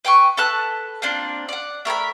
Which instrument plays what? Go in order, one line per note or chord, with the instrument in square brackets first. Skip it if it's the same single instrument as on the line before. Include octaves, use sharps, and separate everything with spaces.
[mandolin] B4 G5 G#5 C#6
A4 B4 A5 F#6
A#3 C4 D4 F4
D5 F#5
A3 A#4 G#5 B5